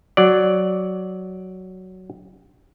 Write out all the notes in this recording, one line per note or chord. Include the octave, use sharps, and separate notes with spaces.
F#3 D5